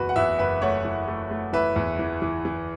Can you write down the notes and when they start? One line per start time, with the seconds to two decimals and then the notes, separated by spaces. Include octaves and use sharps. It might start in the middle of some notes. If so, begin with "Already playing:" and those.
Already playing: F#1 E2 F#4 B4
0.09 F#5
0.16 E2 B4 E5
0.39 F#1 B4 E5
0.62 A3 C#5 F#5
0.85 E3
1.08 A3
1.30 A3
1.53 E3 B4 E5
1.76 E2
1.99 E3
2.22 E3
2.45 E3